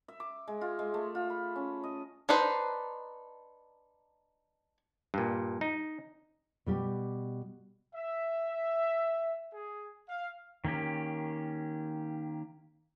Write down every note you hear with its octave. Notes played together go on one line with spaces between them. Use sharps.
E5
D6
G#3
F4
G#3
A3
F4
B5
C#4
D#5
D4 D#4 B4 C5
G2 A#2
D#4
B2 G3 G4
E5
G#4
F5
D#3 A#3 C#4 G4